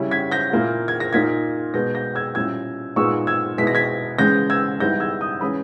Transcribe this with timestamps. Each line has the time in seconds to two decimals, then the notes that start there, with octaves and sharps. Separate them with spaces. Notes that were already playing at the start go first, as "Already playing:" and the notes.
Already playing: C#3 G3 C#4 E4
0.11 G#6 B6
0.31 G6 A#6
0.52 A#2 A#3 E4
0.88 G#6
1.00 A#6
1.13 A#2 A#3 D#4 G#6 B6
1.74 B2 G#3 B3 G6 A#6
1.95 G6 A#6
2.15 E6 G#6
2.35 A#2 G3 C#4 E4 E6 G#6
2.96 A#2 G#3 B3 D#4 C#6 E6
3.27 E6 G#6
3.58 B2 G#3 B3 E4 B6
3.67 A#6
3.75 G#6 B6
4.19 C#3 E3 G#3 G6 A#6
4.50 E6 G#6
4.80 G#2 G3 B3 E4 G6 A#6
5.00 E6 G#6
5.21 D#6 G6
5.41 E3 G#3 C#4 B5 D#6